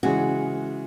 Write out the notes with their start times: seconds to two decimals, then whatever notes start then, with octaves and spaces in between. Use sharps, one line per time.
0.03 C#3 E3 G#3 F#4